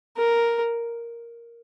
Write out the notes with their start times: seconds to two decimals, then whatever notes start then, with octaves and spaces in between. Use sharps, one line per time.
0.17 A#4